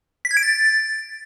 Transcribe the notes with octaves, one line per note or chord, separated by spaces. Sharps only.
B6
G#6
D7
A6